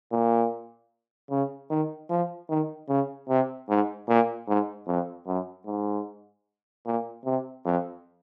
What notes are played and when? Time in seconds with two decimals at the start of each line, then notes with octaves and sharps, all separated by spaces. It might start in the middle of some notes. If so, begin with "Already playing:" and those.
0.12 A#2
1.31 C#3
1.70 D#3
2.10 F3
2.49 D#3
2.89 C#3
3.28 C3
3.69 G#2
4.08 A#2
4.48 G#2
4.87 F2
5.27 F#2
5.66 G#2
6.86 A#2
7.25 C3
7.65 F2